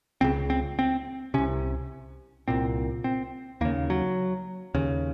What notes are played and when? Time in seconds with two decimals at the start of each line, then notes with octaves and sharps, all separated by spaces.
0.21 C#2 C#3 C4
0.50 C4
0.79 C4
1.34 C3 C#4
1.38 C2
2.48 C2 A#2 C4
3.04 C4
3.61 D#2 A#3
3.65 C#3
3.90 F#3
4.74 D#2 C#3